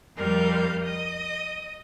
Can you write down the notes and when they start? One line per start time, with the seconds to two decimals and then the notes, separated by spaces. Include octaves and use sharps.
0.16 F2 G3 A#4 F5 G6
0.81 D#5 D#6